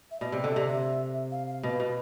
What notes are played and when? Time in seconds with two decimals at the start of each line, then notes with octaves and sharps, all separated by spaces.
0.11 E5
0.20 B2 D5
0.32 C3
0.44 D3
0.56 C3
0.68 E5
1.31 F5
1.47 F5
1.63 B2 B4
1.80 B2